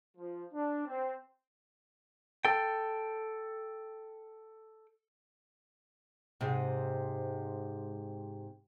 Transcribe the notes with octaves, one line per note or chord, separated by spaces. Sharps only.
F3
D4
C4
A4 G5
G#2 C3